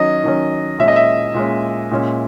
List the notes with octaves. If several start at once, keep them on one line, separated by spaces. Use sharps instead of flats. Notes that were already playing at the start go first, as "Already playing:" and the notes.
Already playing: D#3 F#3 C#4 D#5
D#3 F#3 C#4
A#2 G#3 C#4 E5
D#5
E5
A#2 G#3 C#4
A#2 G#3 C#4